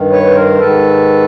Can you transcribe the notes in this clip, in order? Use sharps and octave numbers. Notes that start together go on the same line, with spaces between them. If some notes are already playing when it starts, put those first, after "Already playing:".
Already playing: G2 D#3
B4 C#5
A#4 C5
G#2 D#3 A4 B4